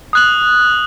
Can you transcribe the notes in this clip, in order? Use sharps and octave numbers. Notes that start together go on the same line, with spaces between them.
D#6 F#6 F#7